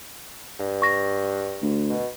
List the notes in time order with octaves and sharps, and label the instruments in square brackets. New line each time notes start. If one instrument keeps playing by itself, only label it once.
[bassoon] G2
[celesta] C#6 A#6
[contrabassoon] D2
[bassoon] B2